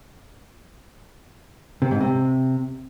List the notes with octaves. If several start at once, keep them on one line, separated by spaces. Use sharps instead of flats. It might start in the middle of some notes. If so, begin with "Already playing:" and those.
C3
G#2
C3